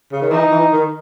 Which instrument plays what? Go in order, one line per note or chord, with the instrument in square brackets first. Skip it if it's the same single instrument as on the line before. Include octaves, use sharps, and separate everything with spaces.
[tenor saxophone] C#3
D#3
[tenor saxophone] E3 [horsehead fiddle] D#4
[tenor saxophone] E3
D#3